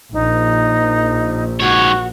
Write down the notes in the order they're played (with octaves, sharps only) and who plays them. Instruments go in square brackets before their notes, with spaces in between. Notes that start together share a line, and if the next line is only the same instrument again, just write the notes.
[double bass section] A#1 [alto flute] D#4
[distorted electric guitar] G#2 C#5 [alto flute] F#4